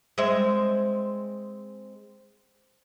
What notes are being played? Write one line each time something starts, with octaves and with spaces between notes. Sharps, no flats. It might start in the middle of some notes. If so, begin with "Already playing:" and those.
G#3 C4 E5